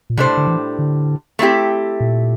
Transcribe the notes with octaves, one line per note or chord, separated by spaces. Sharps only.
A#2
A2 C3 G3 D4 A4 C5
D3
E3
D3
A3 C4 E4 G4
A#2